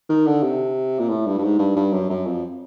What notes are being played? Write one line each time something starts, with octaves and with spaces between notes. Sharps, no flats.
D#3
D3
C3
A#2
A2
G2
G2
G#2
G2
G2
F#2
F#2
F2